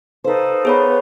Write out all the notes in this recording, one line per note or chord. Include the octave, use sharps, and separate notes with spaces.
D#4 A4 B4 C5 F5
B3 G#4 C#5 B5